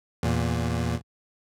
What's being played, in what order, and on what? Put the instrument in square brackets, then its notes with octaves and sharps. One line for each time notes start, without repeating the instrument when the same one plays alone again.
[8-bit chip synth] E2 A#2